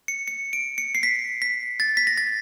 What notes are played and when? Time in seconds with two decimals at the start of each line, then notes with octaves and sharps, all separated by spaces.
0.08 C#7
0.28 C#7
0.53 D7
0.78 C#7
0.95 C7
1.03 B6
1.42 B6
1.80 A6
1.97 B6
2.07 A#6
2.17 A6